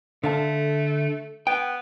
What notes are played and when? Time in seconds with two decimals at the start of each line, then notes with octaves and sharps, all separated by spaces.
0.24 D3 A3 F5 A5
1.47 B3 G5